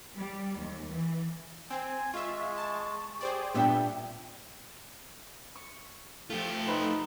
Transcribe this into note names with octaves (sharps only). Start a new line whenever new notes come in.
G3
D#2
E3
C4 G#5
G#3 F4 E5 C#6
A5
G4 G#4 C5 D5
A#2 G3 B3 D4 E5 G5
C#6
F3 A3 F4 G4
D#4 B4 C5 F#5